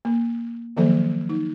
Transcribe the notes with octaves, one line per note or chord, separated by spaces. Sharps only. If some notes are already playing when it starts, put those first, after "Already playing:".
A#3
D#3 F3 F#3 A#3 A4 C5
D#4